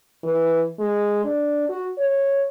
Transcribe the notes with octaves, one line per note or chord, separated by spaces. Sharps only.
E3
G#3
D4
F#4
C#5